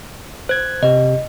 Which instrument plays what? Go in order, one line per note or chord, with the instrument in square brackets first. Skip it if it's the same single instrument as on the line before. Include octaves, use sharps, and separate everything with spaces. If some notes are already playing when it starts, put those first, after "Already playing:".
[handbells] C5 [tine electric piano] F#6 G#6
[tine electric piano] C3 G4 [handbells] D#5